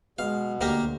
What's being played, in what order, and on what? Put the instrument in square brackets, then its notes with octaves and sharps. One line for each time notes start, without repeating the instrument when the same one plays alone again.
[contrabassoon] B2 [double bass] G#3 [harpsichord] F5
[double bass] D2 [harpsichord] A#3 G4 A#4